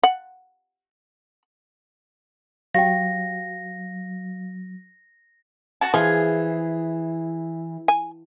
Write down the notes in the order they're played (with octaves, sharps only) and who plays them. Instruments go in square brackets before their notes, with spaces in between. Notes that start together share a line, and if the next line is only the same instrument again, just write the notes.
[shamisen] F#5
[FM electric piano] F#3 [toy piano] G4 G5 [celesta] F5 [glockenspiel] A#6
[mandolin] F#4 A5
[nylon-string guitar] E3 [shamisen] F3 [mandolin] G#4
[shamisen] G#5